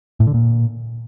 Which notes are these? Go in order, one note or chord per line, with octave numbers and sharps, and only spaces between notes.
A2
D3
A#2